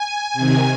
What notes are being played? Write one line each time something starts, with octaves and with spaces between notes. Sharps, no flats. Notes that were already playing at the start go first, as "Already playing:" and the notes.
Already playing: G#5
C3
D#3